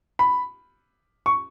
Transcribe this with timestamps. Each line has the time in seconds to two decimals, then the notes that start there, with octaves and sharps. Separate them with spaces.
0.19 B5
1.26 C#6